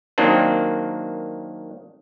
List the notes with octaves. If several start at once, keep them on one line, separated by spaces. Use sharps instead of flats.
D#3 F#3 A#3 C4 D4